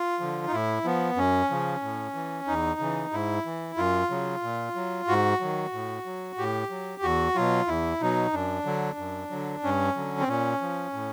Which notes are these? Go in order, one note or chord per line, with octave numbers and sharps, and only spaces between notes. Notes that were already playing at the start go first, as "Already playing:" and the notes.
Already playing: F4
D3 F3
D#4
A2 E4
F3 B3
F#2 C#4
C#3 F3
A2
E3
E2 D#4
C#3 E3
G#2 E4
E3
F#2 F4
C#3 F#3
A#2
F#3
G#2 F#4
D#3 F#3
A2
F#3
A2 G4
F#3
E2 F#4
B2 F#3 F4
E2 E4
B2 F#3 D#4
F#2 D4
D3 F#3
F#2
D3 F#3
G2 C#4
D3 F#3
C4
A#2 C#4
F3
A2